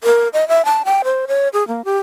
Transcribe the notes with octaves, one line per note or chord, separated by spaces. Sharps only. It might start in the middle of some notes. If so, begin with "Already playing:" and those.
A#4
D#5
E5
A5
G5
C5
C#5
G#4
A#3
G4